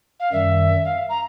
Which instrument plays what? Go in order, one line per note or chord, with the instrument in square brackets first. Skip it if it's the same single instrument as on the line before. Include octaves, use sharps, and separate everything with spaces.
[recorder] F5
[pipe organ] F#2 D#3 G3 [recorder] E5
[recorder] F5
A#5